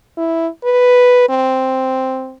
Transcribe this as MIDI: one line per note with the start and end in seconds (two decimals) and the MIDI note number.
0.18 0.47 64
0.64 1.27 71
1.29 2.36 60